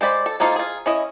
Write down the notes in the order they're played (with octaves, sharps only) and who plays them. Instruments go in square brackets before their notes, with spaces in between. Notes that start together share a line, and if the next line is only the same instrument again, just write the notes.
[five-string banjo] G#3 C5 D5 B5
A4
F3 A#3 D#4 F4 A4
F4 G#4
C#4 E4 D#5